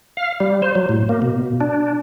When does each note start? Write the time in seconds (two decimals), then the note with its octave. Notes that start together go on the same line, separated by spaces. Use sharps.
0.17 F5
0.40 G3
0.62 C5
0.75 F#3
0.89 A2
1.09 A#3
1.22 B2
1.61 D4